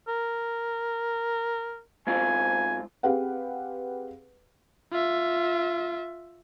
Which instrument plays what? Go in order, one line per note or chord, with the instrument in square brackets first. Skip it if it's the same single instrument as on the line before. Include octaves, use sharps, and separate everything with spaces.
[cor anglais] A#4
[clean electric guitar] G#2 C4 F4 [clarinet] G#5
[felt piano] C4 G4 G#4 B4 F5 F#5
[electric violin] F4 E5